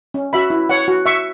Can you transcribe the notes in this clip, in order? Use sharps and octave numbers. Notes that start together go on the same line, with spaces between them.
C#4
F#4 E5 B5
E4
C#5 F#5
F#4
E5 C#6